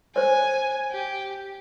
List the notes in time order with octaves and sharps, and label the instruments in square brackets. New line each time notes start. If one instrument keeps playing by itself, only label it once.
[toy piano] C5 C#5 [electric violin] G#5
[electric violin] G4